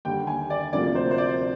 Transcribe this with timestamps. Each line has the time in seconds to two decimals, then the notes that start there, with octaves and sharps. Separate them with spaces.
0.05 D#2 D3 G3 G5
0.27 G#5
0.50 D5
0.73 D2 C3 F3 A#3 D5
0.95 C5
1.11 C5
1.18 D5